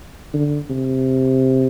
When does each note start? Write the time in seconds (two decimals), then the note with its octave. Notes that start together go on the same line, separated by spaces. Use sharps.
0.34 D3
0.70 C3